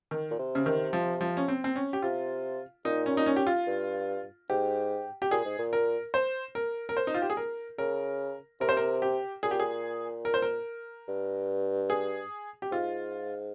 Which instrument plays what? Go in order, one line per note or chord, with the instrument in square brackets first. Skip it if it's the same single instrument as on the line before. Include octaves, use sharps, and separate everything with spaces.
[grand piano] D#3
[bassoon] A#2
C3
[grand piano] C#3
D#3
F3
F3
C#4
C4
C4
C#4
G4
[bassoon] C3 [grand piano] F4
[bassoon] A#2 [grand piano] D#4
[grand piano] C#4
D#4
C#4
G4
F4
[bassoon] G2
[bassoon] G#2 [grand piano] G4
[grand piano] G4
[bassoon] A#2 [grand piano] G#4
[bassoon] G#2
A#2
[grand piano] A#4
C5
A#4
A#4
C5
D#4
F4
G4
G#4
A#4
[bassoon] C#3 [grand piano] A#4
[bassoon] C3 [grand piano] A#4
[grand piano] C5
A#4
G4
[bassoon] A#2 [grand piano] G#4
[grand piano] G4
G#4
A#4
C5
A#4
[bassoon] G2
[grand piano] G#4
G4
[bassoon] G#2 [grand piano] F4